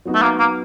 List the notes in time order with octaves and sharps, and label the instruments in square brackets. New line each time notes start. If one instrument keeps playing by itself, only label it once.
[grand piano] F#3 B3 D#4 F#4
[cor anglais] A3
A#3
A#3